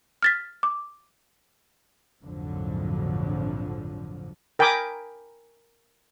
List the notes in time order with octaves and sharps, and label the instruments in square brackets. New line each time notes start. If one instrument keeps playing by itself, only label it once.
[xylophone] F6 A6 B6
D6
[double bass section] A#1 F2 G#2 D3 F3 F#3
[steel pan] A#4 G5 G#5 B5 D6 D#6